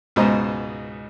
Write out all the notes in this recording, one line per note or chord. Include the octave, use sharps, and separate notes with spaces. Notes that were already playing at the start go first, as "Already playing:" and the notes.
C#2 G#2 B2 C5 D#5 A#5